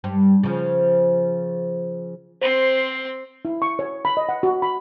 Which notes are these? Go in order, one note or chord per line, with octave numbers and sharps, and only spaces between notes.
G2
C#3 F3
C4 C5 C6
E4
C#6
C#5
B5
D#5
F#5
F#4
B5